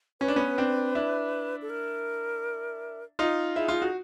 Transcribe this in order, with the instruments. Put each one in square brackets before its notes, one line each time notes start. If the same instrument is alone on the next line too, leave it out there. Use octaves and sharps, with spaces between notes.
[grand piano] C#4 [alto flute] B4
[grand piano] D4
B3 C#4
C4 D4
D4 E4
[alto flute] A4
A#4
[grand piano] D#4 F4
[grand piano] E4 [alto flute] G#4
[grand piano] F4
F#4